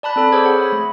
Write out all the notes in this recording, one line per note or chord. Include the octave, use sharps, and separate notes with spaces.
D5 A5 B5 F#6
C4 A4 B5
G#4 C5 C#5 D6 E6 G#6
F#5
C#5 B5
A3